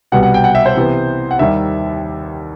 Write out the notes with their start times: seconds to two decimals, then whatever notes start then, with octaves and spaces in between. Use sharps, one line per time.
0.12 C2 B2 G3 B3 F#5
0.23 F#5
0.34 G5
0.44 F#5
0.55 E5
0.66 C5
0.75 C3 E3 B3
1.31 F#5
1.39 D#2 D#3 G3 E5